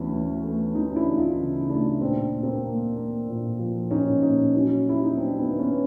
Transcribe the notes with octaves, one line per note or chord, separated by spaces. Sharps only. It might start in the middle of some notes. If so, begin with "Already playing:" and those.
Already playing: D2 E3 B3 C#4
E3
A3
E3 C#4 D#4
D4 E4
D2
D#4 F4
C#3
A3 D4 E4
A#2 C4 D4
A#2
A#3 C4
A#3
A#3
A#2
F3
A#2 C#4 D#4
A#2 C#4 D#4
F#3 C#4 D#4
F#3 E4
D#4
F#3 C4 D4
B3
D#3
B3 C#4